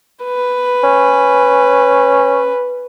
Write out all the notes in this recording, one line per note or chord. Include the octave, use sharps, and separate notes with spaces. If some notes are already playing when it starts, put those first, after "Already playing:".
B4
C#4